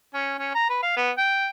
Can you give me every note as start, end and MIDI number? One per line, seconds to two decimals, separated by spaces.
0.14 0.34 61
0.39 0.53 61
0.55 0.67 82
0.69 0.78 71
0.82 0.96 77
0.96 1.10 59
1.18 1.49 79